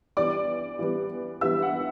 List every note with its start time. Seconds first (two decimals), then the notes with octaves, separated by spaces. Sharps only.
0.17 E3 G3 B3 D5 D6
0.79 E3 G3 B3
1.41 E3 G3 B3 E5 E6
1.62 F#5